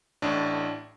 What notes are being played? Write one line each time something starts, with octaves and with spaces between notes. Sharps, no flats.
A1 A2 D4